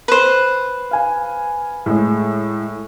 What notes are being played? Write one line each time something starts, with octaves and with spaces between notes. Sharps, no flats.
B4 C5
F5 G#5
A2 G#3